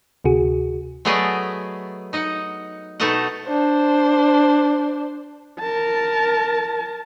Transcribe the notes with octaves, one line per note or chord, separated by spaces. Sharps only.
D2 C3 F#4 G#4
F#3 A3 B3 G#4 D5 D#5
D#4 D#5 F#5
B2 A3 D#4 A4 D#5 F#5
D4 C5
A#4 A5